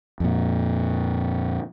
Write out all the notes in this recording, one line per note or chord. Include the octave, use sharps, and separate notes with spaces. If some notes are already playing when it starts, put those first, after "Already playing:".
F2 A#2